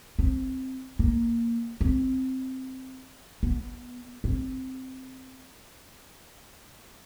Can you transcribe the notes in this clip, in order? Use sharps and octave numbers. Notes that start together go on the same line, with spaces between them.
C4
A#3
C4
B3
C4